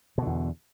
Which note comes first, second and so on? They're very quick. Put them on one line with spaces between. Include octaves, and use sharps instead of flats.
B2 D3 E2